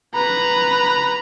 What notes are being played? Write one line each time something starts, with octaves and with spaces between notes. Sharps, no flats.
B4 A#5